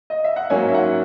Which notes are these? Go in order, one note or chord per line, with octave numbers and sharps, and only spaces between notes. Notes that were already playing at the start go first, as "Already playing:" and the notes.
D#5
E5
F#5
G#2 F#3 A#3 C#4 G#5
E5
F#5